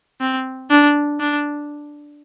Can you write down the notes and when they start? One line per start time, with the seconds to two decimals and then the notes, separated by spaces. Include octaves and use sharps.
0.21 C4
0.71 D4
1.20 D4